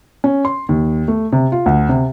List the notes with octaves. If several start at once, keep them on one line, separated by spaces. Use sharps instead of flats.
C#4
C6
D#2
A3
C3
F4
D2
C3